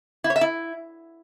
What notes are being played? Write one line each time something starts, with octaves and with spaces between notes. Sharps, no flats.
E4
C#5
E5
E4